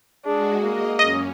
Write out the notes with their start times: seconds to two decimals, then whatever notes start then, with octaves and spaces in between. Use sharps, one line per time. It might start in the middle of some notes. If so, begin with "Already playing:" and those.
0.25 G#3 D4 F#4 G#4
0.62 A#3 D#5
0.99 F#2 C#4 D#5